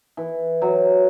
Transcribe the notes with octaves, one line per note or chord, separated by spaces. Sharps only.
E3
F#3